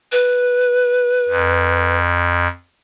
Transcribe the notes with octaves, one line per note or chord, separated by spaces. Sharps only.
B4
F2